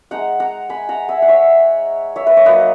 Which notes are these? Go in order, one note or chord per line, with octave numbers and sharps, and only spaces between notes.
G#3 D#4 F#5 A#5
F#5 A#5
G#5 B5
F#5 A#5
E5 G#5
F#5
C#5 E5
C#5 E5
B4
C#5
F#3 A#3 D#4 B4 D#5